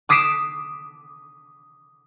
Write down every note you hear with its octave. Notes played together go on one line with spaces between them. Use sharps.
D6 D#6 B6 C7 D7 E7